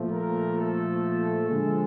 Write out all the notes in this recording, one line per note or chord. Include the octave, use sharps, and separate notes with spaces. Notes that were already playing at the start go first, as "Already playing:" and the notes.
Already playing: A#2 F3 A3
A#4
A4
D3 F3 G#3